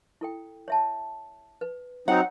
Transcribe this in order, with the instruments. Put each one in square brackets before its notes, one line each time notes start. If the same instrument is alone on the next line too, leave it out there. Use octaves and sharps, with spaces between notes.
[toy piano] E4 A4 G5
C#5 E5 A5
B4
[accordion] F#3 C4 D#4 [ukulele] F#5